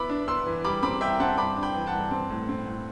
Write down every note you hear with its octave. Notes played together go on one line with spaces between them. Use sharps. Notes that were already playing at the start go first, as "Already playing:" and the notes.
Already playing: B3 E4 B5 D6
D4
B3 C6 E6
E3
G3 B5 D6
C4 B5 D6
C2 E5 G5
C4 F#5 A5
G2 B5 D6
D4
G5 B5
E3
F#5 A5
G2
C4
A2
C4
A2